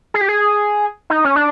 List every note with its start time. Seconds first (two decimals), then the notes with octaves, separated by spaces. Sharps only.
0.14 G#4
0.21 G4
0.29 G#4
1.10 D#4
1.25 C#4
1.36 D4